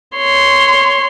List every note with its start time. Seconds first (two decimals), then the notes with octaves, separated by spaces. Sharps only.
0.17 C#5 C6